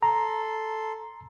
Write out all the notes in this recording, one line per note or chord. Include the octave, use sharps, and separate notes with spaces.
A4 A#5 C6